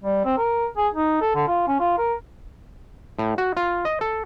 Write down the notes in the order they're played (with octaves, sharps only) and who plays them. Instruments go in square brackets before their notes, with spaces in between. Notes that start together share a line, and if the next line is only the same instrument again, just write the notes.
[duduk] G3
C4
A#4
G#4
D#4
A4
D3
F4
C#4
F4
A#4
[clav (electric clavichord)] A2
F#4
F4
D#5
A4